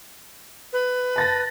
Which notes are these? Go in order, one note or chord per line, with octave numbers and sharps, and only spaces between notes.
B4
A5 A6 A#6